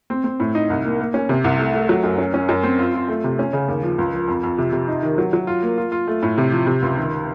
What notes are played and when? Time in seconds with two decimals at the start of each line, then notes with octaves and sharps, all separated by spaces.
0.10 C4
0.24 C4
0.40 A2
0.55 D#4
0.70 C2
0.85 A#3
0.99 A#3
1.14 C#4
1.29 C3
1.44 C2
1.59 A3
1.74 A3
1.89 F#3
2.03 F#2
2.18 C#4
2.34 C#4
2.49 F#2
2.63 C4
2.79 F4
2.94 F4
3.08 A3
3.24 C3
3.39 C#4
3.53 C#3
3.68 D#2
3.83 F3
3.98 C#2
4.13 F3
4.28 F2
4.43 F2
4.58 C3
4.72 C3
4.88 D#4
5.03 D#3
5.18 F#3
5.33 F#3
5.47 F4
5.62 A#3
5.77 F4
5.92 F4
6.07 A3
6.23 A2
6.38 C3
6.52 F3
6.67 C3
6.82 C#2
6.97 D#3